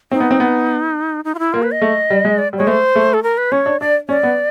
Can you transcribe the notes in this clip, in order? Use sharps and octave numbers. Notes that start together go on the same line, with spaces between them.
C4 D#4
B3
C4
B3
D#4
F4
E4
A#3 F4
B4
D#5
A3
G3
G#3
D5
G3
G#3 C#5
A3 C5
A3
A4
A#4
B4
C#4 C#5
D4
D4 D5
C#4 D5
B3